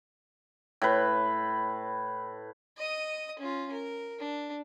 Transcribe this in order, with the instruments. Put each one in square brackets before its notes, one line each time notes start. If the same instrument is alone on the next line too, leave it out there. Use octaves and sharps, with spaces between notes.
[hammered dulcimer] A2 B4
[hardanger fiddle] D#5 D#6
C#4 F4
A#4
D4